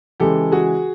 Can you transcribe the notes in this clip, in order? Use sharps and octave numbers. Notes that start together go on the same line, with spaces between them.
C#3 E3 G#3 G4 A4
F#4 G#4